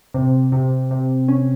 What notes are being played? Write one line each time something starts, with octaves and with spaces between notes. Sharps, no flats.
C3
C3
C3
C#4